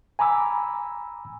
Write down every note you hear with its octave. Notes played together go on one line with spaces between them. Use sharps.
G#5 A#5 B5 D6 E6